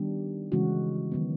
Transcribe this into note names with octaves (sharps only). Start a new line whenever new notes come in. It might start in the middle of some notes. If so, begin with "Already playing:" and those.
Already playing: D#3 G3 B3 D4 G4
C#3 E3 G#3 C#4 F#4
D#3 F#3 B3